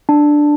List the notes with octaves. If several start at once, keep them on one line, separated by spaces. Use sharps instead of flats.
D4